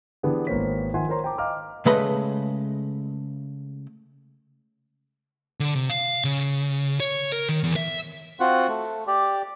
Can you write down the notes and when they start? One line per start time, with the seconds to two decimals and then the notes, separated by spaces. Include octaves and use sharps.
0.23 D3 E3 B3 D4 G4 G#4
0.47 G#1 A#3 B3 C5 C#5 B6
0.94 D#3 F3 E5 F#5 G#5 C6
1.09 A#4 C5 C#5 A#5 C6
1.24 G5 A5 A#5 D6
1.38 D#5 F5 G5 A#5 D6 F6
1.86 C#3 G#3 A3 B4 D#5 B5
5.60 D3
5.75 C3
5.90 F5
6.24 C#3
7.00 C#5
7.32 A#4
7.49 D#3
7.64 E2
7.76 E5
8.40 C4 F4 F#4 F#5
8.68 A3
9.07 G4 D5